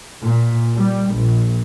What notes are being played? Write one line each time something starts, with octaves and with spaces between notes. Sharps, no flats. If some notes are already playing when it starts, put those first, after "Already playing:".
A#2
G3
A#1